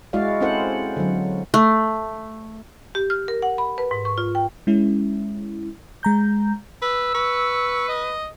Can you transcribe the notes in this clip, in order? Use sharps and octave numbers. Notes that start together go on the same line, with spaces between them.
G#3 E4 F#4 D5 F5
C4 C#4 E4 A4 C5 F#5
D3 F#3
A3
G4
F6
A#4
F#5
B5
B4
G#2
C#6
F4
G5
G#3 C#4 E4
G#3 A#5 G6
B4 E6
B4 C#6
D#5